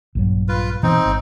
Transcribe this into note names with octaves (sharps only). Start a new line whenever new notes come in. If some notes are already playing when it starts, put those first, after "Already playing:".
A#1 G2 F#3
F4 B4
B2 E3 B3 C4 D#4
G#1